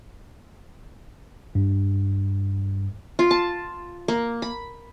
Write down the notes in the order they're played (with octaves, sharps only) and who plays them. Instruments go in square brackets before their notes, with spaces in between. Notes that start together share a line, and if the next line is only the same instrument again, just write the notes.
[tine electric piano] G2
[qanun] F4
A5
A#3
B5